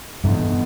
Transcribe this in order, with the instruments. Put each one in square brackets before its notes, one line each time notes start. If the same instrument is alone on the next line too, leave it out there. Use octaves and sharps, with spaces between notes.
[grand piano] F1 E2 B2 [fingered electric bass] G2